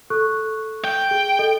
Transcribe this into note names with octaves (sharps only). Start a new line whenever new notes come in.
A4 C#6 F#6
G5
G#4
A4 D#5